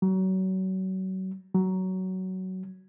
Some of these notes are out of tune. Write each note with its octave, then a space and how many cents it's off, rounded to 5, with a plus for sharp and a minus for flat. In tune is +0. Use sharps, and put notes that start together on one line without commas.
F#3 +30
F#3 +15